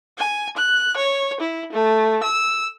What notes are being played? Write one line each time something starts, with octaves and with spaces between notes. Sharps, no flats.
G#5
F#6
C#5
E4
A3
E6